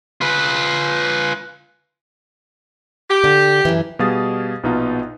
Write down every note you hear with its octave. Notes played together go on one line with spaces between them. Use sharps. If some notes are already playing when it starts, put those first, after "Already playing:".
F4 B4
G4
D3
F#2 E3
B2 G3 G#4 F5 D#6 A6
A#1 B2 B3 D#4 F4